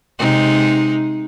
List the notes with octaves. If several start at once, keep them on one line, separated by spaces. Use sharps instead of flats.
C3 G#3 D#4